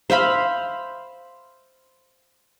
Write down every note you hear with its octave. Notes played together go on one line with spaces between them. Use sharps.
C5 E5 F5 B5